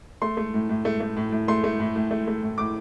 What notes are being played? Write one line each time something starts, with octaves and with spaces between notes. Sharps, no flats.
A3 C6
A3
A2
A2
A3
A3
A2
A2
A3 C6
A3
A2
A2
A3
A3
A2
A2 D6